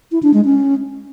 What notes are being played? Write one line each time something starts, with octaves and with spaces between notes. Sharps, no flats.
E4
D4
G#3
C#4